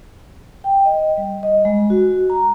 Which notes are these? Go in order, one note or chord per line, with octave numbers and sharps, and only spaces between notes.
G5
D#5
G3
D#5
G#3
F#4
A#5